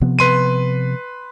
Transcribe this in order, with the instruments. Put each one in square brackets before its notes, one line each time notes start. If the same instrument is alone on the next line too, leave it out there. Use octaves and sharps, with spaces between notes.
[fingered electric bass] C3 F3 B3
[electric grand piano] B4 C6 D#7